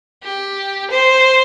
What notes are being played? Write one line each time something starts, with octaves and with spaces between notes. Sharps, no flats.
G4
C5